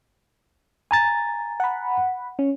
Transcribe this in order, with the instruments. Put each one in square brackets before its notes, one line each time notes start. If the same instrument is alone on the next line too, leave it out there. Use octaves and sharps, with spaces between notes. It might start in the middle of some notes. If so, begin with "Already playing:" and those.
[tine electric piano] G#5 A#5 A6
[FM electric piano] F#5 B5
C#4